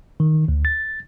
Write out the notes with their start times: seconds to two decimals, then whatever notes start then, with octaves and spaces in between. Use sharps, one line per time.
0.20 D#3
0.48 D2
0.65 A6